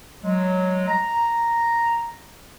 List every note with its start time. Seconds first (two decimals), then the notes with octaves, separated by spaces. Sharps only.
0.23 F#3 G#3
0.88 A#5